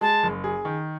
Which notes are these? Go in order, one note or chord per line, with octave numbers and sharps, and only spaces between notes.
G#3 A5
F#1
G#4
D#3